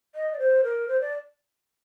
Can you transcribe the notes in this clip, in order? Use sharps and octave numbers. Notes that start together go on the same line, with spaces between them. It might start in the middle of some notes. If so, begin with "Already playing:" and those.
D#5
D5
C5
A#4
C5
D5